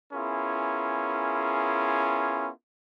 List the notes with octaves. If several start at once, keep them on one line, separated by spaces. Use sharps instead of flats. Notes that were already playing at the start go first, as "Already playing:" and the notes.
B3 C#4 E4 F4 G#4 A#4